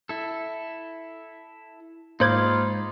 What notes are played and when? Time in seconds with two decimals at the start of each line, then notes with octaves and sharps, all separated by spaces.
0.09 E4 A4
2.20 G#2 A#3 D#4 F4 C5 B5 D6 G#6